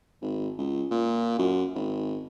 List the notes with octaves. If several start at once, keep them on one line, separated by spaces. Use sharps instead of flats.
G#1
C#2
A#2
F#2
G#1